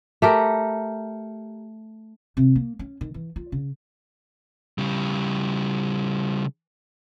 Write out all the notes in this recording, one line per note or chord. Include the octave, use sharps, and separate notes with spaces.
A3 G4 A#4
C3
A#3
C#4
D#3
E3
F4
C#3
C#3 G3